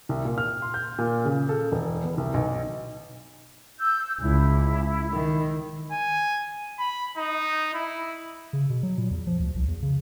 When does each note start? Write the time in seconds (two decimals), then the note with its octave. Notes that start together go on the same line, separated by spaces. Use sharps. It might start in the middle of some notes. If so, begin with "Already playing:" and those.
0.09 C2
0.25 A#2
0.38 F6
0.62 C6
0.74 G6
0.98 A#2
1.25 C#3
1.49 A4
1.72 E1
2.04 B3
2.18 C2
2.34 B1
3.79 E6 G6
4.21 C#2 E4
5.12 D#3
5.92 G#5
6.79 B5
7.18 D#4
7.74 E4
8.53 C#3
8.70 B2
8.83 F#3
8.98 A#2
9.11 E2
9.27 F3
9.40 D2
9.55 C2
9.68 E2
9.82 C#3